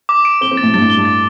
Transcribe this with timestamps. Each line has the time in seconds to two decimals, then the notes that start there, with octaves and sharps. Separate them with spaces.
0.09 D6
0.25 D7
0.41 C4 G7
0.51 C4
0.57 A6
0.63 A2
0.74 G2 A6
0.81 A2
0.90 G7
0.97 G2
1.05 A6